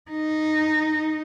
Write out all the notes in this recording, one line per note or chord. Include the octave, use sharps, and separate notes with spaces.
D#4